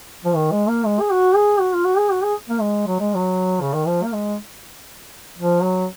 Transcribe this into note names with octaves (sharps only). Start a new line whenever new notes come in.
F3
D#3
G#3
A#3
G#3
G#4
F#4
G#4
F#4
F4
F#4
G#4
F#4
G#4
A#3
G#3
F#3
G#3
F#3
C#3
D#3
F3
A#3
G#3
F3
F#3